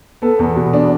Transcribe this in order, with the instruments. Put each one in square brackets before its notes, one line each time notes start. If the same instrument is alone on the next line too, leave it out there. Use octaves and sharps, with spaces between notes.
[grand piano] B3 A4
E2
B2
D4